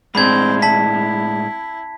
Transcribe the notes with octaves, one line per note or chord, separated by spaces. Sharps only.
A2 G#3 C4 D4 B5 G#6
E4 A5 B6